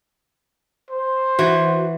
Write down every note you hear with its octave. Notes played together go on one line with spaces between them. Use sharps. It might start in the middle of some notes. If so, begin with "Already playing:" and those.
C5
E3 F#4